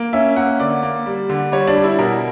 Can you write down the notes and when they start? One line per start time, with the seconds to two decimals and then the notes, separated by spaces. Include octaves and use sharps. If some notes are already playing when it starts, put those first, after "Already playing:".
Already playing: A#3
0.13 C#4 E5
0.36 A#3 F#5
0.60 D3 D5
0.83 A#3
1.06 G3
1.30 D3
1.52 G3 C#5
1.67 D4
1.76 G3
1.84 E4
1.98 B2 A#4